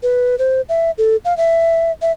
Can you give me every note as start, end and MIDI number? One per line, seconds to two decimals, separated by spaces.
0.03 0.38 71
0.39 0.61 72
0.69 0.91 76
0.98 1.16 69
1.25 1.36 77
1.37 1.92 76
2.02 2.12 76